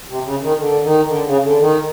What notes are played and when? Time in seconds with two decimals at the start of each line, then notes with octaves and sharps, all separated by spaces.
0.08 C3
0.24 C#3
0.41 D#3
0.58 D3
0.83 D#3
1.08 D3
1.25 C#3
1.43 D3
1.60 D#3